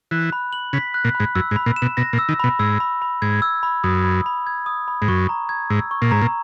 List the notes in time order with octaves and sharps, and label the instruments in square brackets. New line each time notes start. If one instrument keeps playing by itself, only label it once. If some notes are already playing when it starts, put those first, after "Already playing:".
[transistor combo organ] E3 [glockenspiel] F#6
[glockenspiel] B5
F#7
[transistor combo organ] C#3 [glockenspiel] B6
[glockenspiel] F#6
[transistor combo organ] A#2
[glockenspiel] B5
[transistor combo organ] G#2
[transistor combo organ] F#2 [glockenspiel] E6
[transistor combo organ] G#2
[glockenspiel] B5
[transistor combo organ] A#2
[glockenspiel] E7
[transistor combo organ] B2
[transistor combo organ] B2 [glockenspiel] A#6
[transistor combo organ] A#2
[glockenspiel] E6
[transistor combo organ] D#3
[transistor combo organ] B2 [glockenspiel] B5
[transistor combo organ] G#2 [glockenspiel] E6
[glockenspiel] B5
B5
[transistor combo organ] G#2 [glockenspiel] G#6
[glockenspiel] E6
B5
[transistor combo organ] F#2 [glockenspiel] D#6
[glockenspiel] B5
B5
G#6
D#6
B5
[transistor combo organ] G#2
[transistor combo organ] F#2 [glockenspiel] C#6
[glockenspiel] A#5
G#6
[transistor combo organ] G#2 [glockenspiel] E6
[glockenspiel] C#6
[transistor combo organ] A#2
[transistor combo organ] G#2 [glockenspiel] A#5
[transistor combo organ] A#2